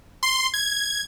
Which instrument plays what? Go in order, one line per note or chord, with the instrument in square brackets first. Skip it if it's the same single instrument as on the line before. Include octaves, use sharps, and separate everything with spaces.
[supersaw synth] C6
G#6